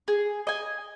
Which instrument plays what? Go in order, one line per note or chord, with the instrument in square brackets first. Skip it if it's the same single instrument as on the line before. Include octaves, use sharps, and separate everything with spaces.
[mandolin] G#4
D#5 G#5